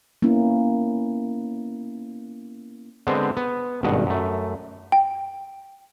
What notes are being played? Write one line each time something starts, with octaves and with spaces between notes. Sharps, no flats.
A#3 B3 C#4 E4
D3 G#3 B3 C4 C5
B3
G#1 G2 B2 D#5 F#5
F#2 A3
G5